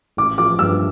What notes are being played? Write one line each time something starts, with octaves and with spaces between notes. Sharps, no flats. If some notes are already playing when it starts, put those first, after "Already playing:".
A1 D6
F3 D6
G2 E6